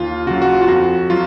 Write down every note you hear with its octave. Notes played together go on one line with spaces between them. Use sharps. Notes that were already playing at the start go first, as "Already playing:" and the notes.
Already playing: D#2 F4
C#3 F#3 F4 F#4
F#4
F4
F2 F#4
F#3 F4